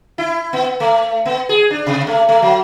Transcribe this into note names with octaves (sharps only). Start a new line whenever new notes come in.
E4
B3
A3
B3
G#4
D4
C3
A3
A3
F#3